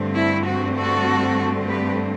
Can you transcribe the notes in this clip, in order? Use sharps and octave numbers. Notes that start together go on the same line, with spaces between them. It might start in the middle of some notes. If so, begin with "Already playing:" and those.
Already playing: G2 D3 A3 C4
E4
F#4
F#4 A4
G4 B4